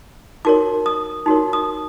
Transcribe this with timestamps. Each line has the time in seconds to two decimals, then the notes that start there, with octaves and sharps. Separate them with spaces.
0.45 D#4 F#4 A#4 C#5 D6
0.86 D#6
1.26 D#4 F#4 A#4 C#5
1.53 D#6